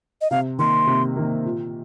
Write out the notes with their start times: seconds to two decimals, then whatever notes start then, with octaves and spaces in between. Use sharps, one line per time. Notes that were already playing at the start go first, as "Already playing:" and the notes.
0.21 D#5
0.31 C3 F5
0.59 D#3 A#3 C6
0.87 C3
1.16 D#3 A#3
1.45 A#2